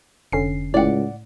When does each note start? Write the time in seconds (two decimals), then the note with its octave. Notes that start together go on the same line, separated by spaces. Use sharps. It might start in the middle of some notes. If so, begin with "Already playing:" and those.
0.32 F1 D3 C#4 C7
0.74 C#2 A2 D5 F#5